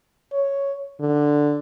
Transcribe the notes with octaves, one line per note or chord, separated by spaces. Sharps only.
C#5
D3